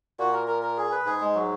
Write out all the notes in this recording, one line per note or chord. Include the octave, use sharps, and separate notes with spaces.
A#2 F#4
A#4
A#4
A#4
G#4
B4
G#2 G#4
G#3
F#3